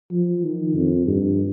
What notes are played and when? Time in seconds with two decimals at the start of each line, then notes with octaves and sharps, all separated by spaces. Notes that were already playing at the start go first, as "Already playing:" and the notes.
0.12 F3
0.44 D#3
0.76 F2
1.07 G2